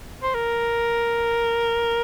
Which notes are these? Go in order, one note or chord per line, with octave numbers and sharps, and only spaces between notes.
C5
A#4